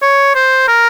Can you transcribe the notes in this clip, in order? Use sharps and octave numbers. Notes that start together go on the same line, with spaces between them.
C#5
C5
A#4